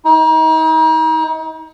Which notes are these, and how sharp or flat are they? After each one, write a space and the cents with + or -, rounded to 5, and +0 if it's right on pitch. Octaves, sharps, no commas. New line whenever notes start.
D#4 +35